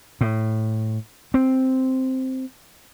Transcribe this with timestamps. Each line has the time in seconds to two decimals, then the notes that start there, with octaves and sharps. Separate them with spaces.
0.21 A2
1.34 C4